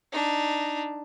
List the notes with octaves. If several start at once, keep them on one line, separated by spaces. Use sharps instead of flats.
D4 D#4